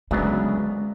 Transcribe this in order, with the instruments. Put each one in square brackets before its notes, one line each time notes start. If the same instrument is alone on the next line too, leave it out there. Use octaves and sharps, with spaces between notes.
[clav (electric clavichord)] D2 C#3 F#3 B3 D4 [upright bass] G#3